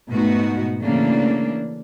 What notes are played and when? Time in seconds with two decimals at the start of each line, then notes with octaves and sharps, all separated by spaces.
0.10 G#2 B2 A3 B3 D#4 F#4
0.81 C#3 E3 A3 A#3 D4